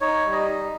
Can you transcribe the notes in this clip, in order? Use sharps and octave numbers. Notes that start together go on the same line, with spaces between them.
D#4 C#5
G3
D#5
D#4